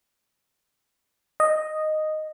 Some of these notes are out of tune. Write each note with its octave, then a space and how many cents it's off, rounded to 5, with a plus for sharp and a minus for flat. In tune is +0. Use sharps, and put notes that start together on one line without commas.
D#5 -5